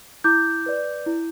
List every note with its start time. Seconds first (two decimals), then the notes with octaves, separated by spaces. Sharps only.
0.24 E4 D6 G6
0.66 B4 D5
1.06 E4